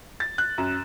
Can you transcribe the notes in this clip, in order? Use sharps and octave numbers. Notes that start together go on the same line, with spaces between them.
A6
F#6
F#2